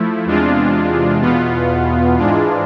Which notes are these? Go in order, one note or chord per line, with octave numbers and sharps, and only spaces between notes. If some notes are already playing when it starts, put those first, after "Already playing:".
Already playing: F3 A3 E4
E2 C3 G#3 D4 F4
E2 B2 B3 F4
G#2 E3 G#3 D4 F4